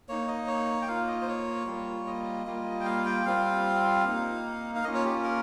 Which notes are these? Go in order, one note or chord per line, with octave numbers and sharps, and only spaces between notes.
A#3 D#4 C#5
D#5
C#5
G5
A#3 F4 F5
D#5
C5
C#5
G3 A#3 F4
D#5
G3 A#3 F4
G5
F5
G5
G3 C4 F4 F5
A#3 D#4
F5
A#3 C#4 F4 D#5
C#5
G4
A#4